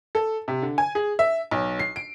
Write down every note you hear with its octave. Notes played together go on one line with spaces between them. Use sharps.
A4
C3
D3
G#5
G#4
E5
B1
C7
D7